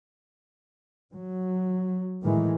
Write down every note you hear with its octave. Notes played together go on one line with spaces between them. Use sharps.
F#3
A2 D#3 E3 G#3